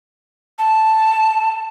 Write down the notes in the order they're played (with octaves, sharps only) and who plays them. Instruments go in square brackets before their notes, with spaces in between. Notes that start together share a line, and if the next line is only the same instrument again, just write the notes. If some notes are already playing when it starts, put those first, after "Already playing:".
[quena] A5